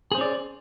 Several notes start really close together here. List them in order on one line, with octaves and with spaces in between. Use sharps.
G#4 C5 C#4 D5